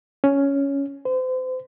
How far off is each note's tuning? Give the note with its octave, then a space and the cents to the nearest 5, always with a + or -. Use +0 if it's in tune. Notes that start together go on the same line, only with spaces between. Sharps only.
C#4 +5
C5 -35